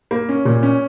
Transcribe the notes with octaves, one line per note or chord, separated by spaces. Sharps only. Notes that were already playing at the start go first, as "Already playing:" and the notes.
A#3
C#4
A#2
C#4